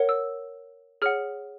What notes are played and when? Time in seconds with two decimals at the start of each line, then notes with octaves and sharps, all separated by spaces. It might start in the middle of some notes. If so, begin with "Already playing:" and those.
Already playing: A#4 C#5 F#5
0.09 E6
1.02 G#4 C#5 F#5 F6